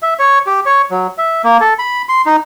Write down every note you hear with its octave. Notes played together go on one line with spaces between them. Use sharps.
E5
C#5
G4
C#5
F#3
E5
A#3
A4
B5
C6
D#4